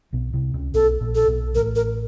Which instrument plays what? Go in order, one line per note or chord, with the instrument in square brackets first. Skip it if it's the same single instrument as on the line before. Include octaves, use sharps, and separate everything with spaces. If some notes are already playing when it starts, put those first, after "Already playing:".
[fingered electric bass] B1 B2
C2 C3
C#2 C#3
[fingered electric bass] B1 B2 [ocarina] A4
[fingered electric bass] A#1 A#2
[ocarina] A4
[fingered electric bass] B1 B2
[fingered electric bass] A1 A2 [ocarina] A#4
[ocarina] A#4